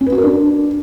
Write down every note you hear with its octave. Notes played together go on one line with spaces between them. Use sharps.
C#4
B4
F#4
A#4
D4